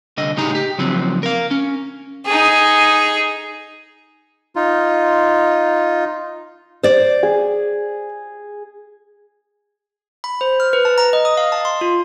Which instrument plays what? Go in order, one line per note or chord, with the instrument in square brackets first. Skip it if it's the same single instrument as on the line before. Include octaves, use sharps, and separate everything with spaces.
[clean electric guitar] C2 D3 D#5
A2 C#3 D#4 G4 G#4 A#5
G4
C#3 F3 F#3 C4
A#4 F5
C#4
[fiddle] D#4 G#4
[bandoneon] D#4 F4
[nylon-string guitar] C5 D5
[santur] G#4
[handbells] B5
C5
F6
B4
A5
A#5
D#5
D#6
F5
A5
C6
F4